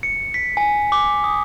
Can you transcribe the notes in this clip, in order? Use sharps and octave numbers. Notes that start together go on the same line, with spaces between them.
C#7
B6
G#5
D6
D#6